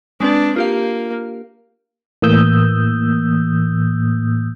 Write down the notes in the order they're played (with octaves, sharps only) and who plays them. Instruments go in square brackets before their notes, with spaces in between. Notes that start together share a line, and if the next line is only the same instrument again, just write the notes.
[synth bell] G#3 C4 B4 [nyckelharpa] D4
[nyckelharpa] A#3 [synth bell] F4 G4 F5
[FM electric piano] A2 E3 A#3 D#6 E6 G6